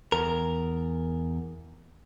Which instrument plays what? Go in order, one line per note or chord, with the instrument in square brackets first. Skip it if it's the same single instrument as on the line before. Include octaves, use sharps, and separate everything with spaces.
[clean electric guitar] E2 A#4